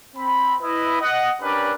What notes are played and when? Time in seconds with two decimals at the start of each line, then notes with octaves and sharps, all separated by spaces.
0.16 C4 B5
0.61 E4 B4 D#5
1.01 D#5 F#5
1.42 C#4 D4 G4 A#4 B4 D5